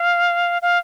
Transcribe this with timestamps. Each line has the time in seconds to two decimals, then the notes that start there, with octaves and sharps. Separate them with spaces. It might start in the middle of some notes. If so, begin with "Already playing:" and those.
Already playing: F5
0.62 F5